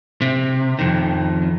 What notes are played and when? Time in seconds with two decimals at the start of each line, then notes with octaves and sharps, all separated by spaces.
0.22 C3
0.79 F2 D#3